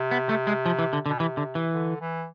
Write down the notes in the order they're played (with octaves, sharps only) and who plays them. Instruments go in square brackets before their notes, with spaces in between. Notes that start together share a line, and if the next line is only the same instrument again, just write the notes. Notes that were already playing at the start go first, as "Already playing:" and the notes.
Already playing: [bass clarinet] C3
[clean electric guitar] B3
A3
G#3
F3
E3
D3
D3
[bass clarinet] B2
[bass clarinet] C3 [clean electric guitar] E3
[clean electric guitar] D3
E3
[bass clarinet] D3
E3